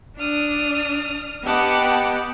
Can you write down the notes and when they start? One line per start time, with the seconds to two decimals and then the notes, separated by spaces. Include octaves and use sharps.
0.18 D4 D#6 F6
1.45 B3 G4 D#5 F#5 G5 A5 D6